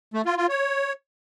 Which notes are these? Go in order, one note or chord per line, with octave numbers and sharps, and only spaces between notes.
A3
F4
F4
C#5